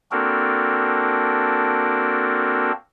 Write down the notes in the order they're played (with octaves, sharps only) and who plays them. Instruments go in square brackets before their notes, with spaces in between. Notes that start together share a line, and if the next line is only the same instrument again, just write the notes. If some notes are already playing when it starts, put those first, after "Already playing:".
[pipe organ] A#3 C4 D4 F#4 A4 A#4